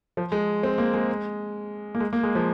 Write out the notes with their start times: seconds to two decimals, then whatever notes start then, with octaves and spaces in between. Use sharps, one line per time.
0.17 F3
0.32 G#3
0.63 C4
0.78 A#3
0.94 G#3
1.95 A#3
2.00 G#3
2.13 A#3
2.23 G#3
2.35 F3